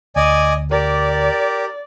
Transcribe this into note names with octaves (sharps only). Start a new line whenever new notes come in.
D2 D5 D#5 G#5
G4 A#4 D5